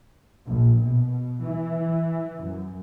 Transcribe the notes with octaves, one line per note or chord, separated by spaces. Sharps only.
A#1
B2
E3
F#2